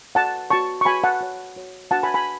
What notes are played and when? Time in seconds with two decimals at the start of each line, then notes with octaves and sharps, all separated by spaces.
0.15 F#4 B4 F#5 A5
0.50 F#4 B4 A5 C#6
0.81 C#6
0.85 F#4 B4 G#5 B5
1.04 F#5 A5
1.21 F#4 C#5
1.56 F#4 C#5
1.91 D4 F#4 B4 F#5 A5
2.03 G#5 B5
2.14 G#5 B5